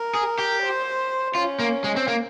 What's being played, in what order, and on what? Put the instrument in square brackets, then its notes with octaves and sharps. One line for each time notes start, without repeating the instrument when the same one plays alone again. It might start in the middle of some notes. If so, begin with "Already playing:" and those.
Already playing: [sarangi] A#4
[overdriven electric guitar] G#4
G4
[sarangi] C5
[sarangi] C#4 [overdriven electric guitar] F4
[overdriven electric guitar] A#3
G#3
C4
A#3